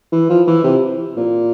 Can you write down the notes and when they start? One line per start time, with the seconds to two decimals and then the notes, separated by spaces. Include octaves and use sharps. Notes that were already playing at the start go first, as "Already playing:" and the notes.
0.12 E3
0.29 F3
0.47 E3
0.64 C3
1.17 A#2